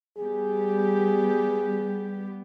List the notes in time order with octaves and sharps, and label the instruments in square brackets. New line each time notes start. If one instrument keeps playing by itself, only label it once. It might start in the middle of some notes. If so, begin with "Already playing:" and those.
[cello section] G3 B3 G4 [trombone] G#4